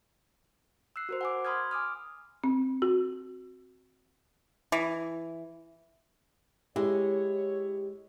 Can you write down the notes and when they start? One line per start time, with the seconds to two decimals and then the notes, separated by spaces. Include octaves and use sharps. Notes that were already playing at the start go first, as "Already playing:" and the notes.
0.96 E6 F#6 C7
1.09 F#4 A#4 C5
1.21 F#5 G#5 D6
1.45 B5 C6 D#6 F6 G#6
1.71 G#5 D6 D#6 F6
2.44 C4
2.82 F#4
4.72 E3
6.76 G#3 E4 G4 C#5